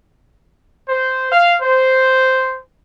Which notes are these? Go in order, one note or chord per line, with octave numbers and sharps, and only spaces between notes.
C5
F5
C5